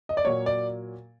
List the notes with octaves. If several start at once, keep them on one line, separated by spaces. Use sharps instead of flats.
D#5
D5
A#2 F#3 A#3 C#5
D5